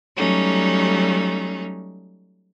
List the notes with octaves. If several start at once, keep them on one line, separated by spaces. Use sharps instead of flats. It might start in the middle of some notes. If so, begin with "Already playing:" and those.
F#3 G3 A3 C#4 D#4